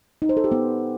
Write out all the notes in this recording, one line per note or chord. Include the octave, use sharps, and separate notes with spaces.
D#4
C5
A4
G4
B3